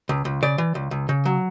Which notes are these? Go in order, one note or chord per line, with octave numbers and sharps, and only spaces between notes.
C#2
C#2
C#3 D5
E3
C#2
C#2
C#3
F#3